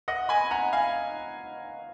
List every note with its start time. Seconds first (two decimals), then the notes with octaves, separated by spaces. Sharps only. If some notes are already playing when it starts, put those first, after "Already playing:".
0.08 D#5 F#5
0.29 G#5 B5
0.51 F#5 A#5
0.73 F5 G#5